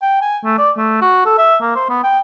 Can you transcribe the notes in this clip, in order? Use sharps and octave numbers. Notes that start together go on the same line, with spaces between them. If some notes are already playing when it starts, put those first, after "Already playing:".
G5
G#5
A3
D5
A3
F#4
A4
E5
A#3
C5
B3
G5